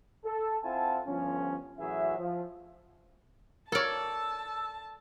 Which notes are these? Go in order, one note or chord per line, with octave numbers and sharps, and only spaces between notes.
A4
C4 E4 F4 F#5 G#5 A5
G1 F3 C#4
A2 E3 F#3 F#4 G#4 E5
F3
A4 A#4 C#5 D5 A5 E6